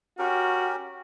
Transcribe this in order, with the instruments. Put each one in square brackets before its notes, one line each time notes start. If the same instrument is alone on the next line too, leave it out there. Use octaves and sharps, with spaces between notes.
[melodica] C#4 G4 A#4 [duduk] F#4